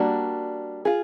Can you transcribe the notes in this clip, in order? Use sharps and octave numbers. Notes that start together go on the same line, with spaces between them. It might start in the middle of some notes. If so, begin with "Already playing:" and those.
Already playing: G3 A#3 D4 F#4
F4 G#4